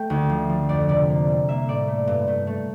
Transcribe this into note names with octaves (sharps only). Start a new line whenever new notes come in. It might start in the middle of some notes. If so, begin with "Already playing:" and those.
Already playing: A3 E5 G5
D2
F3
F3
F2 D5
C3 D5
A#3
G3
A#3 E5
A2 D5
A3
G2
A3
A3